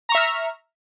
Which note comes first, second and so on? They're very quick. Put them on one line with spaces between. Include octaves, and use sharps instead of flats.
A#5 C#6 E5 F6